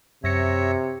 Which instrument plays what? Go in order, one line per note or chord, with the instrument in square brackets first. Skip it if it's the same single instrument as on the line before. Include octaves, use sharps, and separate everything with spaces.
[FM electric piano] F#2 A#6 C#7 [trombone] C3 [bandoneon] C#5 E5